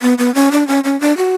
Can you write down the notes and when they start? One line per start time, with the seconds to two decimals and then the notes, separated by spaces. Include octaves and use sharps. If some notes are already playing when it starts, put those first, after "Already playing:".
0.02 B3
0.18 B3
0.35 C#4
0.52 D4
0.68 C#4
0.84 C#4
1.01 D4
1.17 F#4